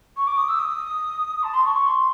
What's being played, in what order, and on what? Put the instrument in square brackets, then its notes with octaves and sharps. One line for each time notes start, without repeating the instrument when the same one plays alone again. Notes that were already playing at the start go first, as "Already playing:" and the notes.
[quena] C#6
D6
D#6
E6
D#6
A5
C6
C#6
C#6
C6